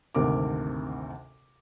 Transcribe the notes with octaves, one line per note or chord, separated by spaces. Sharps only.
G#1 D2 C3 A#4 D6